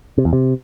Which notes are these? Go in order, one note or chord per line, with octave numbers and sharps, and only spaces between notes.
C3
E2
C3